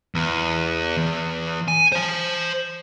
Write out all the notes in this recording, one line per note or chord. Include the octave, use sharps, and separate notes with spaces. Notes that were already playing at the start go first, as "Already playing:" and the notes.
E2
E2
G#5
C5 A5